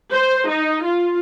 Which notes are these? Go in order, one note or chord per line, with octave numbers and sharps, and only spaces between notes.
C5
D#4
F4